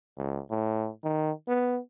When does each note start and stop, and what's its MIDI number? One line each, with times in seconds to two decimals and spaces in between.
0.17 0.40 37
0.50 0.89 45
1.04 1.32 51
1.48 1.79 59